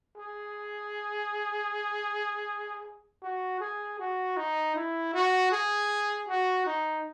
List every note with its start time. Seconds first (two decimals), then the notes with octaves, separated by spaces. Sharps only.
0.17 G#4
3.23 F#4
3.60 G#4
3.99 F#4
4.37 D#4
4.75 E4
5.14 F#4
5.52 G#4
6.28 F#4
6.66 D#4